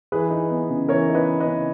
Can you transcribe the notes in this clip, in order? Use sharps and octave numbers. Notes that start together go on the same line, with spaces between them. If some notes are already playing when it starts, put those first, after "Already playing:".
E3 G#4 B4
D#4
B3
C#3
E3 A#4 C#5
D#4
B4 D#5
B3
B4 D#5
C#3